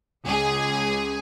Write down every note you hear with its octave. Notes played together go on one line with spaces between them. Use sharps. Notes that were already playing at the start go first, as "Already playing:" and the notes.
C#2 G#4